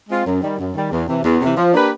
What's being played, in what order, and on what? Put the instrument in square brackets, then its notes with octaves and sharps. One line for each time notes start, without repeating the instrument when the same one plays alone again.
[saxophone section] G#3 C4 F4
F#2
D#3 G3
F#2
D#3 G3
E2
C3 E3
E2
C3 E3
F3
A#3 D4 G4 B4